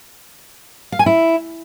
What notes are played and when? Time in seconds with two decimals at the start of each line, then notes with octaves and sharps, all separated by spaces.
0.92 F5
0.99 G#5
1.06 E4